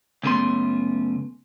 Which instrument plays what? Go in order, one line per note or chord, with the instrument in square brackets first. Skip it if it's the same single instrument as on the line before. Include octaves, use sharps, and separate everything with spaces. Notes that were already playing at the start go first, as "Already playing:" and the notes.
[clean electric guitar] C#2 F#2 C#3 A3 B3 C6